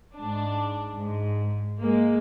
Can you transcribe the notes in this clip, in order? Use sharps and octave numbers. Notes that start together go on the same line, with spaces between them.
G#2 D4
G#2
G#3 A#3